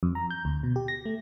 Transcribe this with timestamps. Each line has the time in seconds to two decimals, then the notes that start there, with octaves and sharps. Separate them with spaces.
0.03 F2
0.15 A#5
0.30 G6
0.45 D2
0.63 B2
0.76 G4
0.88 A#6
1.05 A3